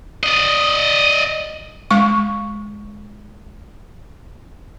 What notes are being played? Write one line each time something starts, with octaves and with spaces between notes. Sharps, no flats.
D5 D#5
G#3 C#6